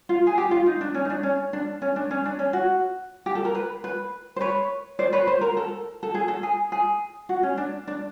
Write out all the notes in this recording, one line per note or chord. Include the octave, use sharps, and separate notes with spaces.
F4
G#4
G4
F4
D#4
D4
C#4
D#4
D4
C#4
D4
C#4
D4
C#4
D4
C#4
F#4
G4
A4
A#4
B4
B4
C5
B4 C#5
C5 D5
B4 C#5
C5
A#4
A4
A4
G#4
A4
G#4
G#4
F#4
C#4
D4
D4